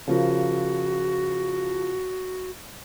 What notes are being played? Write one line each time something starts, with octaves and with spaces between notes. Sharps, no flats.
C#3 F3 F#4 A#4